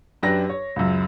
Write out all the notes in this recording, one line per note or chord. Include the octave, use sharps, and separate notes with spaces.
F#2 D4 G4 B4 A#6
C#5
C#2 F#2